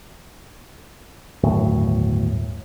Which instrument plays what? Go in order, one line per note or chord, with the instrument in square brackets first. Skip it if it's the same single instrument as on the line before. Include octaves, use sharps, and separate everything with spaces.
[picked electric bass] G1 D#2 A2 F#3